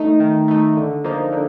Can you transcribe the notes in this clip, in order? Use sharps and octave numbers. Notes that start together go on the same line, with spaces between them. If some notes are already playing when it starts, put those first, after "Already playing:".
Already playing: A3 D#4
D#3
A3 D#4
D3
F3 A#3 D#4
D3